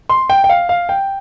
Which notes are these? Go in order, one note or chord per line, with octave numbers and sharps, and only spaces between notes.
C6
G5
G5
F5
F5
G5